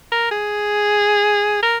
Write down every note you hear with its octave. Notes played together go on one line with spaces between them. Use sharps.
A#4
G#4
A#4